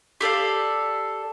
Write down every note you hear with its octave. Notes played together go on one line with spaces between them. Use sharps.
G4 A4 D5 F5